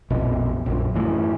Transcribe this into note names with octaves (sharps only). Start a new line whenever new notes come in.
A#1 F2 B2
A#1 F#2
F#2 A2 E3